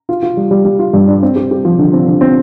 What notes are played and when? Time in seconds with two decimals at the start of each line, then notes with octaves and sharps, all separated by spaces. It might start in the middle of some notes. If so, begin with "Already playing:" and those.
0.09 F4
0.23 F4
0.37 G3
0.51 G3
0.65 G3
0.79 F4
0.93 G2
1.07 D4
1.22 C4
1.36 G4
1.51 G4
1.65 F3
1.79 D3
1.93 C4
2.07 D3
2.21 C4